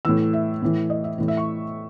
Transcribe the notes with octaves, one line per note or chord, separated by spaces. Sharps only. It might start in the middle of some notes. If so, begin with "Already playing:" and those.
A2 E3 E6
E5
A2 E3
D#5
E5
A2 E3
E5
C#6